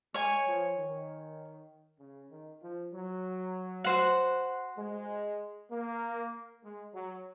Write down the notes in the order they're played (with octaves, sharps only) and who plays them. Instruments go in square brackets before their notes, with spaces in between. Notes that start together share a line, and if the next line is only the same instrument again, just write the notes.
[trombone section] G#3 [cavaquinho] C#5 G#5 C#6
[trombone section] F3
D#3
C#3
D#3
F3
F#3
[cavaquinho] F#4 C5 F#5
[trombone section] G#3
A#3
G#3
F#3